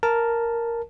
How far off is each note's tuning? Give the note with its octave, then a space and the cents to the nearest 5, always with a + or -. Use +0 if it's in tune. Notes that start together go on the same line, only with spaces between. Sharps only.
A#4 +0 A5 +0